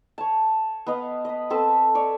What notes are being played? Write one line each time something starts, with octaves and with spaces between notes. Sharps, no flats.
C#5 A5
B3 B4 D#5 F5
D#5 B5
C4 A4 B4 A5
C#5 D5